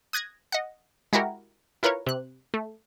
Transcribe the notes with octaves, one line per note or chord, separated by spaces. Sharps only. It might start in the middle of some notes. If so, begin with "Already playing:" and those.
D#6 F#6 G#6 A#6
D#5 F#5
G#3 E4 F#4 G4 A#4
E4 F4 A#4 B4 C#5
C3 F#6
A3